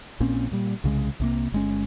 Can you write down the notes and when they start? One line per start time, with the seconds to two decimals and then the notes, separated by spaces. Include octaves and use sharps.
0.20 A#1 A#2 C4 C#4
0.52 A#2 G3
0.84 C2 C#3 G#3
1.20 C2 C3 A#3
1.52 G1 G#3 C#4